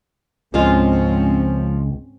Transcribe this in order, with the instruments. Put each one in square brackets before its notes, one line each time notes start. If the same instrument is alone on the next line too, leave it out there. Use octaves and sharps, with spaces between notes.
[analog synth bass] C#2 [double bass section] G#2 C4 C#4 [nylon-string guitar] F3 G#3 F4